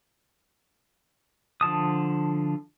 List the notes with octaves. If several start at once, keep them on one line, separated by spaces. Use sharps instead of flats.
D3 F3 A5 D#6